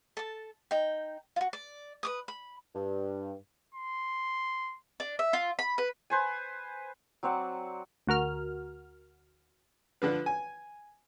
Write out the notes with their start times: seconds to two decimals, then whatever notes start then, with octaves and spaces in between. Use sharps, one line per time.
0.17 A4 A5
0.71 D#4 G5
1.36 F4 F#4
1.53 D5
2.03 B4 D6 D#6
2.28 B5
2.75 G2
3.75 C6
5.00 D4
5.19 E5
5.33 F4
5.59 B5
5.78 B4
6.10 B4 C5 G#5
7.23 F#3 C4 D5 F#5
8.07 D2 F#4 A#4 F6
10.02 D3 F3 B4
10.26 G#5